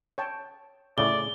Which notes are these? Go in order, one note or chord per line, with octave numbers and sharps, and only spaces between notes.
C#5 G5 A5
A2 C#3 G#4 D5 G7